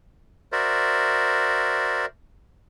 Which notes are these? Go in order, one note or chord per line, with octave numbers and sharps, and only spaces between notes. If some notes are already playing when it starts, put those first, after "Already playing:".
F#4 A#4 C5 D5 E5